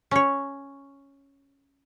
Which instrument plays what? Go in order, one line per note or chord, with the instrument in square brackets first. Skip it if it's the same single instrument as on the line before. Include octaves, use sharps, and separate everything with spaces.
[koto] C#4 C#5